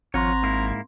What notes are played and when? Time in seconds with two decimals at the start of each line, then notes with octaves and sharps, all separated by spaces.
0.14 G#1 F3 C4 F4 C#5 A#5 C6
0.43 G#2 A#3 E4